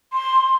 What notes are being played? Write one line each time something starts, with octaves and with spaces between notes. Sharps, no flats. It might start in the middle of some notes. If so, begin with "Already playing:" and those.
C6